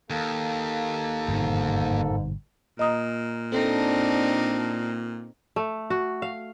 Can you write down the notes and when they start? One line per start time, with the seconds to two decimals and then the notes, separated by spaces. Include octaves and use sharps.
0.10 D#2 A#3 A4
1.28 G1 F2 G#2 B2
2.79 A#2 D#5 A#5 D#6
3.52 C4 D4 D#4 A4
5.56 A3
5.90 F#4
6.22 F5